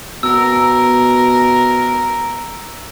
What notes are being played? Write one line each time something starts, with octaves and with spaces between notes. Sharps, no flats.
B2 A#4 E6